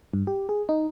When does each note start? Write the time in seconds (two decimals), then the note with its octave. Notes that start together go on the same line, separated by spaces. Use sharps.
0.14 G2
0.27 G4
0.49 G#4
0.69 D#4